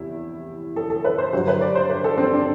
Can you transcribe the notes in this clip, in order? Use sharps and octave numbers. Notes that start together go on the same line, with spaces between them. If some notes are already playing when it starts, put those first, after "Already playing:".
Already playing: E2 C3 E4
A4
A4
B4
C5
G2 D3 F#3 C5
B4
D5
C5
B4
A4
C4
D4